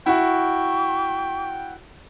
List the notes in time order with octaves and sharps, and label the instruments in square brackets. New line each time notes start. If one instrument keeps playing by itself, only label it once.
[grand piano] E4 F#4 [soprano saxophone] G5 [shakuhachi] C#6